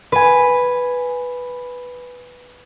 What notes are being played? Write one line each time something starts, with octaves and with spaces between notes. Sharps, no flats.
B4 G#5